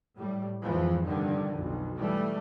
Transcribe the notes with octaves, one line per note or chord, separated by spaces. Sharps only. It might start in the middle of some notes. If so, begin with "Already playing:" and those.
A2 G3
F2 G#2 E3 F3
F1 G2 D3 D#3
B1 F2
E3 G3 A3